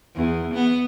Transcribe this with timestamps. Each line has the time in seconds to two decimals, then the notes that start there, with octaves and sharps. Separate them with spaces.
0.15 E2
0.54 B3